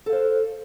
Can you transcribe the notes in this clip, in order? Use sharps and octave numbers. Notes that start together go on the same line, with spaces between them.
A4 C5 F5